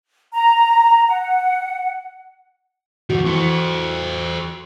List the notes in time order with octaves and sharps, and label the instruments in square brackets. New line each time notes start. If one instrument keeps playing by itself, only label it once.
[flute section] A#5
F#5
[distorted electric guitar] F2 D#3 [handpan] F#4
[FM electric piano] E3 C#7 [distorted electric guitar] A4 C5